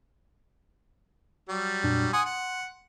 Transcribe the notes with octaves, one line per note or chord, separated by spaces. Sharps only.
F#3 G3
F2 A#2 D4
F#5 G#5 C6 D#6
F#5